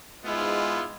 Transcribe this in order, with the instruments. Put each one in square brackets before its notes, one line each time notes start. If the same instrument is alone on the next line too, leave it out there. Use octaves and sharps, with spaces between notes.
[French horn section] G#2 G#3 [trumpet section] B3 E4 F4